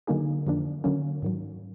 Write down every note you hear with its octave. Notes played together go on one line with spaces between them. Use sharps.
D3 F#3 A#3 D#4 G#4
F2 D3 F3 A#3 D4
D3 F#3 A#3 C#4
G#2 D#3 F#3